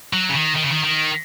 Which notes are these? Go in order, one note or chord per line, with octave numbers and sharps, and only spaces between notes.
F#3
C#3
D#3
D#3
C#3
D#3
D#3